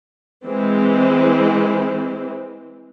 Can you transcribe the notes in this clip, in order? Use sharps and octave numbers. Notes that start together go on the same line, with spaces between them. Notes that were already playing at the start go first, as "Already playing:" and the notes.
E3 G#3 C4